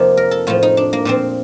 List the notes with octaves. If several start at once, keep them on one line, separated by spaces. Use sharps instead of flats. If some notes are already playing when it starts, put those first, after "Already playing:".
Already playing: F2 C3 F3 A#3 C4 D#4
A#4
A4
A2 F3 F4
D#4
D4
A#3
A#2 F3 C4